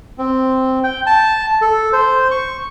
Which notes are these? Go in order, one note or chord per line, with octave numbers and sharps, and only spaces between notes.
C4
G5
A5
A4
C5
C#6